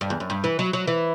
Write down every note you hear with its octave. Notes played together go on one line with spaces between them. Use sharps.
G2
E2
F#2
G2
E3
F#3
F#3
E3